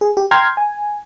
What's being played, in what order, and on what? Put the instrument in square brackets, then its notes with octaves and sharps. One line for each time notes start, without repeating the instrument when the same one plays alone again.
[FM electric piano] G#4
G4
G5 A#5 C6 F6 G#6
G#5